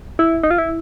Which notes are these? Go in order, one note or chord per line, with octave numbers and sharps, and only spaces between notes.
E4
D#4
F4
E4